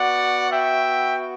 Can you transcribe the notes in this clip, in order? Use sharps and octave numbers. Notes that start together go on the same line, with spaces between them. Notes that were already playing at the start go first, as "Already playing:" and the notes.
Already playing: B3 F#4 D5 F#5
E5 G5